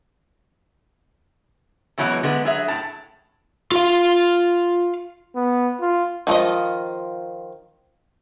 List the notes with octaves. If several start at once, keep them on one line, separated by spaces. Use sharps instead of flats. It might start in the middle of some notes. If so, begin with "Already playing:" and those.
F2 B2 E3 F#3 G#3
D3 G#3 B3
F#3 G#4 E5
A2 A5
F4 F5
B3
F4
D#3 F3 F4 D#5